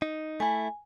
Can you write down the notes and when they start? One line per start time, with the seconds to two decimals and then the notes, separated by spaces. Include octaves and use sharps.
0.02 D#4
0.40 A3 E4 G#5